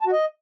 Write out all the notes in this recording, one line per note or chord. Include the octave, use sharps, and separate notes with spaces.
A5
F#4
D#5